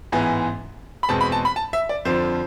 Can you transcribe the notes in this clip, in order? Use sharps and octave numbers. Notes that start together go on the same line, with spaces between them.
A1 G#2 E3 G#3 B3 G#5
B5
E2 B2 G#3 C4 A5
B5
A5
B5
A5
E5
D5
F2 D3 F3 C5